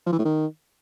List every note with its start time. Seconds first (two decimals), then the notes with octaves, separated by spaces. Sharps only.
0.06 F3
0.12 E3
0.18 A2
0.25 D#3